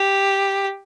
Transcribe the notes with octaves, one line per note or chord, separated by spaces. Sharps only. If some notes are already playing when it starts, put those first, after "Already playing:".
Already playing: G4